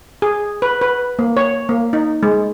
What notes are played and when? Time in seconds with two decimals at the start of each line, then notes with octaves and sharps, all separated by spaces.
0.22 G#4
0.62 B4
0.81 B4
1.19 A#3
1.37 C#5
1.69 A#3
1.93 D#4
2.23 G#3